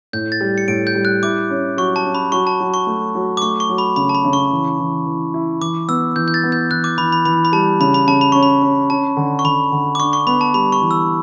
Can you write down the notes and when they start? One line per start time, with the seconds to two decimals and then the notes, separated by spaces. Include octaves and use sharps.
0.13 A2 G6
0.32 A6
0.41 G3
0.58 C#7
0.68 A2 D7
0.87 G6
0.95 G3
1.05 F#6
1.23 E4 D6
1.50 C#4
1.77 F#3 C#6
1.96 A5
2.05 C#4
2.15 B5
2.32 F#3 C#6
2.47 A5
2.60 F#3
2.74 C#6
2.87 A3
3.15 F#3
3.37 D6
3.42 A3 C#6
3.60 C#6
3.69 F#3
3.78 B5
3.96 C#3 B5
4.09 A5
4.15 B5
4.24 C#3
4.33 C#6
4.52 E3
4.79 E3
5.06 E3
5.34 E4
5.61 E3 D6
5.89 B3 E6
6.16 E3 G6
6.28 G6
6.34 A6
6.44 B3
6.52 G6
6.71 E3 F#6
6.84 D6
6.98 E3 B5
7.12 B5
7.25 E3 B5
7.45 B5
7.52 G3 A5
7.80 C#3 B5
7.94 B5
8.07 C#3 A5
8.21 B5
8.32 C#4 C#6
8.43 B5
8.63 C#4
8.90 C#4 A5
9.17 D3
9.39 C#6
9.44 D3 B5
9.72 D3
9.95 D6
10.00 D4 C#6
10.13 C#6
10.27 B3 B5
10.41 A5
10.54 G3 B5
10.72 C#6
10.81 E3
10.91 E6